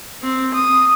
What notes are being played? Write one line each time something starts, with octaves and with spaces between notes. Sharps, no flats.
C4
D#6